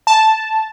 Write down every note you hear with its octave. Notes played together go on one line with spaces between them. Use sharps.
A5